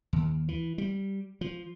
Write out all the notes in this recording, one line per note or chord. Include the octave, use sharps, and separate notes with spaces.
D#2
E3
G3
F3